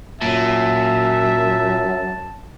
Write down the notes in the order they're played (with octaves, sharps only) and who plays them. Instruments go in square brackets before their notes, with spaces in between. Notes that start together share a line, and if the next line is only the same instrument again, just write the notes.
[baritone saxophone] F#2 [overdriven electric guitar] A#2 [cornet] E5 [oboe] A5